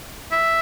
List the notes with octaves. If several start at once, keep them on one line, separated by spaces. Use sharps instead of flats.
E5